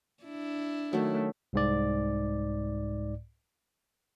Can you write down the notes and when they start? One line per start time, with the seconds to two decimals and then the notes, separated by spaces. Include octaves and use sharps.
0.24 D4 E4
0.93 D#3 F#3 A3
1.53 C2 G#2 D5